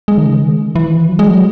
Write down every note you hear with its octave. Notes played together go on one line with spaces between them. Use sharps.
G#3
D#3
C#3
D#3
E3
F#3
G#3
F#3